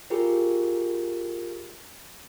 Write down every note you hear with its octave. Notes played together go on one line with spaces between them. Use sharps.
F4 G4 G#4 A#4